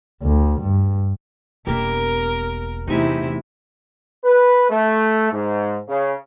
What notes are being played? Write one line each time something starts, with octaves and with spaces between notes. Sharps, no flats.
D2
G2
E1 G3 A#3 B3 A#4 E5
E2 C3 A3 D#4 E4 G#5
B4
A3
G#2
C#3